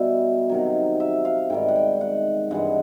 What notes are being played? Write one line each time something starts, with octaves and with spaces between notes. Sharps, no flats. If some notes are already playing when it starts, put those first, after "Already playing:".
Already playing: B2 G3 E5
C3 D#3 F#3
E5
F5
G#2 D#3 G3 G5
F#5
G5
F#5
G2 E3 G#3 F#5